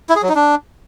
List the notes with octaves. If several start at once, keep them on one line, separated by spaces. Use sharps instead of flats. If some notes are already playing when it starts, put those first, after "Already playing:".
E4
G#4
F#3
D#4
D4